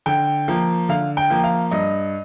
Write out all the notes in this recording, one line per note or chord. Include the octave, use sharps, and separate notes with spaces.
D3 G5
F3 A#3
D3 F5
G5
F3 A#3
F5
G2 D#5